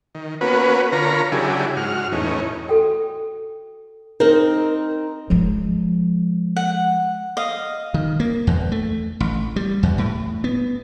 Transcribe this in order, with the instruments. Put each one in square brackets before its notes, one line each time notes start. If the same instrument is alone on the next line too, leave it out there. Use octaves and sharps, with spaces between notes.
[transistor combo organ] D#3
A#3 B3 C#4 F#4 B4
D3 F4 A#4 C#5 A#5 B5
C#3 F#3 D4 E4 G4 G#4
G#2 F#4 F6
E2 A2 C#4 D#4
[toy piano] F#4 A4 G5
[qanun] C4 D#4 [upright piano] A#4
[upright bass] F3 G#3
[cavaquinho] F#5
D#5 F5
[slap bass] D#3
A#3
E2
A3
A1
G3
E2
A2
B3